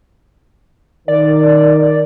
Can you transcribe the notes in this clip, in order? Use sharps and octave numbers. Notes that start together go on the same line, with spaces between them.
D#3 A#4 D5